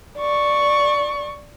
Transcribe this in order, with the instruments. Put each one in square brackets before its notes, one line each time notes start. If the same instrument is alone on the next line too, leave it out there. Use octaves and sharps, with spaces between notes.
[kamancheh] D5 C#6